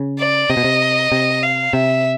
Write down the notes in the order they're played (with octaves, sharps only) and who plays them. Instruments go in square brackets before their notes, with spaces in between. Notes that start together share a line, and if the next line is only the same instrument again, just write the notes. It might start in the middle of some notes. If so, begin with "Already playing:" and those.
Already playing: [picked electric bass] C#3
[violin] D5
[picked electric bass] C3 [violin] D#5
[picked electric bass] B2
C3
C3
[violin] F5
[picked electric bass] C3 [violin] E5